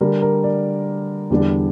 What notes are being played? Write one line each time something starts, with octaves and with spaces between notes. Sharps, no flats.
D3 G3 D4 A#4
A#4
D5
E2 D3 G3 D4